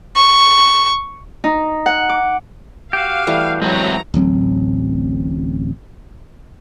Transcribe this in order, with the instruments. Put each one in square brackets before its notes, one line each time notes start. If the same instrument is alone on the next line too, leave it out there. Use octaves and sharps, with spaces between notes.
[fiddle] C#6
[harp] D#4
F#5
D6
[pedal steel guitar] F#4 G4 [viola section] F5
[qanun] E3 G3 A3
[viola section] F#3 A#5 [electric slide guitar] G#3 E4 C#5 [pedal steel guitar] C4
[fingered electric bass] D1 A1 F#3 C4